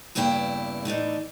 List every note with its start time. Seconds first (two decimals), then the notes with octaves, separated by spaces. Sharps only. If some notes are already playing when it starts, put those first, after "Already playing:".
0.15 E2 G2 C#3 A#3 E4 G5
0.85 A2 E3 D4 D#4